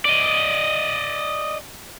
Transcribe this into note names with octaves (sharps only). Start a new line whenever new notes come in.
D5 D#5